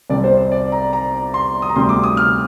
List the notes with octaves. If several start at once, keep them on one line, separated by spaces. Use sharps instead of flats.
C2 C3 G3 D5
C5
C5
D5
A#5
A#5
C6
D#6
A#5
D2 C3 G3 C6
D6
D#6
F6